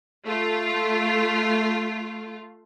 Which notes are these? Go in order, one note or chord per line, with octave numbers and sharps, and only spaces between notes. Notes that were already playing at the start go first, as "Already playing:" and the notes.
A3 F4